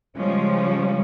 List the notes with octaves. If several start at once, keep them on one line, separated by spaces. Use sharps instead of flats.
C#3 F3 G3 G#3 C#4